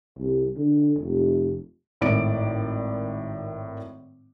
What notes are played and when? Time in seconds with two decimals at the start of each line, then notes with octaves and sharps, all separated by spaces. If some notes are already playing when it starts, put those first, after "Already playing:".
0.19 C2
0.57 D3
0.99 F1
2.01 G#1 A2 D#3 D5 D7